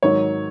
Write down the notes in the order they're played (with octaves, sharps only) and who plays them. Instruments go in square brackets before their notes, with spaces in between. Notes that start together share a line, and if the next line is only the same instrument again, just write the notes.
[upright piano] G#2 D#3 F#3 C#5